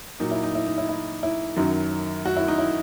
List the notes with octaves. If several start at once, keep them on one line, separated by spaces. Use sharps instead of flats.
A#2 F#3 D#4
E4
D#4
E4
D#4
E4
E4
E4
F#2 D#3 F#3
F#4
E4
D#4
E4